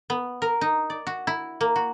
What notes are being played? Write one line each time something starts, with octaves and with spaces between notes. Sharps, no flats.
B3
A#4
D#4
D5
F#4
E4
A#3
F#4